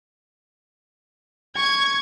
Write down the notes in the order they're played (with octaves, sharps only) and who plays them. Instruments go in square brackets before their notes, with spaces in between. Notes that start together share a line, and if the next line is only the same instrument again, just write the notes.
[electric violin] C#6 [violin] G#6